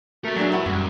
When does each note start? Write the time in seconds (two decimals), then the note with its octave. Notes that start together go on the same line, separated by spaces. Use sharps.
0.25 A3 F#4 A#4 E5
0.36 F#3 A3 D4 G#4
0.52 E4 B4 F#5
0.66 F#2 G3 G#3 C#4